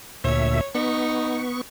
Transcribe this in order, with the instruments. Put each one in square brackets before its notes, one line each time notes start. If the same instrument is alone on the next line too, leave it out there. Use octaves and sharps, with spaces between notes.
[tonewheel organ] D2 A#2 E5 [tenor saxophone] C#5
[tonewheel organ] B3 C#6 [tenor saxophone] D#4